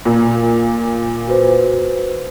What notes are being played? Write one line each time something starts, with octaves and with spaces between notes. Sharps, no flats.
A#2
F#4 B4 C5